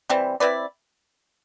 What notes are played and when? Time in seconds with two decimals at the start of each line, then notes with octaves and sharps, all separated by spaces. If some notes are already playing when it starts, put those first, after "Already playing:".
0.10 E3 G3 C4
0.40 C4 E4 B4 D5